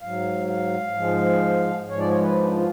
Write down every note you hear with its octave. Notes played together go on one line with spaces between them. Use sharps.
G#2 F#3 F5
F5
G#2 F3 G#3
G#2 F3 G#3 C#5
D5
C#5
B4
D4
F4